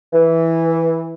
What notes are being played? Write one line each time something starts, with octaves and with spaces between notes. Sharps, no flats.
E3